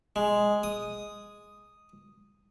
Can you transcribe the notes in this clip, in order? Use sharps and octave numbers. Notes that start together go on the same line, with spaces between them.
G#3
D#6